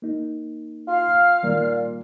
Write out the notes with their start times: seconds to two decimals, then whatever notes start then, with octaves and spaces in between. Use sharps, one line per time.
0.02 A#3 D#4
0.88 F4 F5 F6
1.43 A#2 D#3 G3 A#3